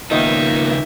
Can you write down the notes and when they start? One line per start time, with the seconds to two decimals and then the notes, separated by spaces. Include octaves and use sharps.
0.11 C#2 D#3 F3 A#3 B3 D#4 E5